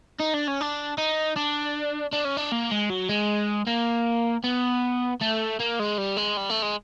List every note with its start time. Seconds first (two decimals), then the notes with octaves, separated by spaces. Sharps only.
0.20 D#4
0.34 D4
0.48 C#4
0.61 D4
0.98 D#4
1.36 D4
2.13 D4
2.25 C#4
2.37 D4
2.52 A#3
2.71 G#3
2.90 F#3
3.09 G#3
3.67 A#3
4.44 B3
5.21 A3
5.60 A#3
5.79 G#3
5.98 G3
6.17 G#3
6.37 G3
6.49 A3
6.62 G#3